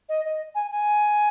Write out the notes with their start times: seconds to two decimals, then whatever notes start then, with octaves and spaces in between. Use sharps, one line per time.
0.09 D#5
0.25 D#5
0.55 G#5
0.71 G#5